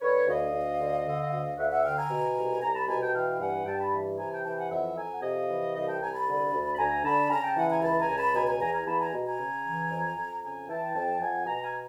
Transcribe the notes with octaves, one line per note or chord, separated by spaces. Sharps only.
D3 B4 C#5
D2 D#5 F5
D2
D3
D3
D2
D2 E5 F#5
E5 F#5
D3 F5 G5
G#5 A#5
B2
C2
C2 G#5 A#5
A5 B5
B2 G#5 A#5
G5 A5
E3 F5 G5
G2 F#5 G#5
G2 G5 A5
A5 B5
E3
C3 G#5 A#5
G5 A5
E3 G5 A5
F#5 G#5
F2 E5 F#5
F2 G#5 A#5
F#5
C3 D#5 F5
E3
C2 D#5 F5
G5 A5
C2 G#5 A#5
A5 B5
D3
D2
B5
D2 G#5 A#5
D3 A5 B5
C#3 G#5 A#5
G5 A5
E3 F#5 G#5
G#5 A#5
C#2 A5 B5
G#5 A#5
C#2
A5 B5
B2 G#5 A#5
G#5 A#5
E2 G#5 A#5
G#5 A#5
E2 A5 B5
G#5 A#5
B2
G#5 A#5
C#3
E3
F2
F2
C#3 G#5 A#5
E3 G5 A5
F2 G5 A5
F2 F#5 G#5
B2 G#5 A#5
G#5 A#5